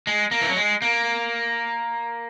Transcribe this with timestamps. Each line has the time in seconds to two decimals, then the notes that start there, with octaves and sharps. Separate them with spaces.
0.07 G#3
0.31 A#3
0.41 E3
0.49 F#3
0.57 G#3
0.82 A#3